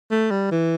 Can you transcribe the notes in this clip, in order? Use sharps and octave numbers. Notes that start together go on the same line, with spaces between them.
A3
G3
E3